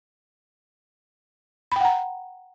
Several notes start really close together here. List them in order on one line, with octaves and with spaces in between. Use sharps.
B5 G5 F#5 A#5